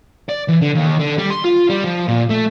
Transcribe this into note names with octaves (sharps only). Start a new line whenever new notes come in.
D5
E3
D3
D#2
D3
G3
C6
F4
G3
F3
A#2
A3